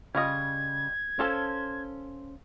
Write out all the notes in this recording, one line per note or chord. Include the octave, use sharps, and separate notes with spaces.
C#3 G3 F4 D#5 G#6
C#4 F4 A4 C5 A5